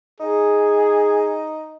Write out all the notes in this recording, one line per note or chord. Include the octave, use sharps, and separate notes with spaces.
D#4 G#4